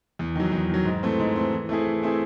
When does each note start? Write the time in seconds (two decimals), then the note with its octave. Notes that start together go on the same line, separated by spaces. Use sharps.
0.19 E2
0.36 D#3 F#3
0.52 E2
0.69 D#3 F#3
0.85 G#2
1.03 E3 A3 C4
1.19 G#2
1.36 E3 A3 C4
1.52 E3
1.69 A3 C4 E4 G#4
1.86 E3
2.02 A3 C4 E4 G#4